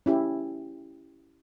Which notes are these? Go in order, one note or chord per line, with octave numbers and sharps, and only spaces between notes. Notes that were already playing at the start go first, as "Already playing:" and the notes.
C#4 E4 G4